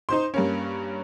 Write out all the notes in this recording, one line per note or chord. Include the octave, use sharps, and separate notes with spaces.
D#4 C5 C6
G2 A#3 C#4